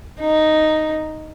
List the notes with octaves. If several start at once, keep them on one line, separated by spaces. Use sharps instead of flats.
D#4